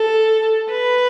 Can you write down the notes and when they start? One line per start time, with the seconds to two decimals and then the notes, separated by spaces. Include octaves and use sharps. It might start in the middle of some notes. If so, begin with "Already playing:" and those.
Already playing: A4
0.71 B4